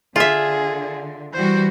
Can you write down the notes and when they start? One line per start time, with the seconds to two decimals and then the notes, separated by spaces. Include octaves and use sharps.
0.16 D3 F4 G#4 E5
1.33 E3 G3 F#4 C5